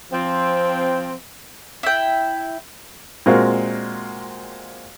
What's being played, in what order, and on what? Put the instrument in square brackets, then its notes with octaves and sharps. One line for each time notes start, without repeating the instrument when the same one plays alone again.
[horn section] F3 C4
[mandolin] E4 G5
[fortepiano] A#2 G#3 C4 F#4 F5